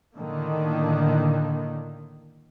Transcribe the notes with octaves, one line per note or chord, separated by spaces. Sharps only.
A2 D3 D#3 A#3